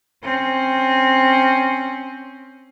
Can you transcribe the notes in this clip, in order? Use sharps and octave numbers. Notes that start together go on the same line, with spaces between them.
C4 C#4